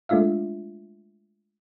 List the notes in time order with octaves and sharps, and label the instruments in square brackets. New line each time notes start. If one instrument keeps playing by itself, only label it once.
[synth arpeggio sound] G#3 A3 D4 F4 E5 F5